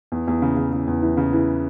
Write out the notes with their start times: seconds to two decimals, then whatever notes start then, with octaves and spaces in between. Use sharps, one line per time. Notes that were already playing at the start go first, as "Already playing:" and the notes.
0.12 E2
0.28 E2
0.42 C#3
0.57 C#3
0.73 C#3
0.87 E2
1.02 E3
1.17 C#3
1.33 E3